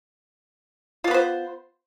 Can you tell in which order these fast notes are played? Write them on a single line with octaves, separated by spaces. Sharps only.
F4 B3 B4 C5